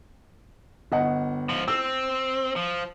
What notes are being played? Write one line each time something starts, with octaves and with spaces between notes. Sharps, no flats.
G1 D#5 F#5
G#2 F3
C4 E6
F3